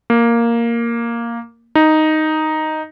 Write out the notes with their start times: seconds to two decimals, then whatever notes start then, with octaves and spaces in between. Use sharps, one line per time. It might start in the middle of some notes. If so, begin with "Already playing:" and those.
0.10 A#3
1.75 D#4